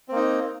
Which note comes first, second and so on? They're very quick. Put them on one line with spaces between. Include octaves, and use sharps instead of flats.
C4 A#3 D#4